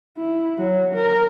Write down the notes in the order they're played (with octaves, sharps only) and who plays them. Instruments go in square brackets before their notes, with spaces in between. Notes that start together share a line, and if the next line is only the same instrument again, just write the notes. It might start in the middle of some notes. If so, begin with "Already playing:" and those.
[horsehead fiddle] E4
F#3
A#4